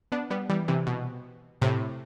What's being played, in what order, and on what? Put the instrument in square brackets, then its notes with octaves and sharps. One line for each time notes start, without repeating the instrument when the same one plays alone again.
[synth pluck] B3 D4
G3 B3
E3 G3
C3 E3
B2
A2 C3